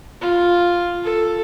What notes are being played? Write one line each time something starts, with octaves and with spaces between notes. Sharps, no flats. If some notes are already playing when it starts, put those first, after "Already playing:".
F4
A4